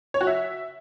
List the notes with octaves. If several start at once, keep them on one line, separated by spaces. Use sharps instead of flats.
C#5
F#4
E5